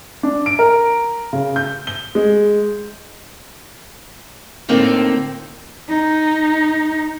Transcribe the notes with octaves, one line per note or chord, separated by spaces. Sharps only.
D4
D7
A#4
C#3
G6
G7
G#3
A2 D3 A#3 C4 D#4 F4
D#4